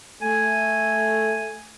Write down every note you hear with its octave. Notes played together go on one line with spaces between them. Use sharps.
A3 G#5